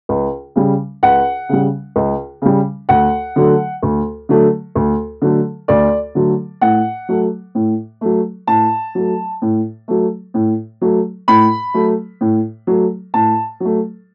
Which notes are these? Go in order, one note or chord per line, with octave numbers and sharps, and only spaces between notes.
C#2
C#3 G3
C#2 F#5
C#3 G3
C#2
C#3 G3
D2 F#5
D3 F#3 A3
D2
D3 F#3 A3
D2
D3 F#3 A3
D2 D5
D3 F#3 A3
A2 F#5
F#3 A3
A2
F#3 A3
A2 A5
F#3 A3
A2
F#3 A3
A2
F#3 A3
A2 B5
F#3 A3
A2
F#3 A3
A2 A5
F#3 A3